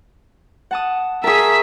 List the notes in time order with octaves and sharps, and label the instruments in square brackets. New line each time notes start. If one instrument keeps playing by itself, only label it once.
[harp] F#5 A5 D#6
[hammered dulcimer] G#4 A#4 [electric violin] E5 B6 [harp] A5 C#6